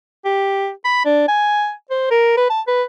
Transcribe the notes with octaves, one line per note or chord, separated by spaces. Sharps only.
G4
B5
D4
G#5
C5
A#4
B4
A5
B4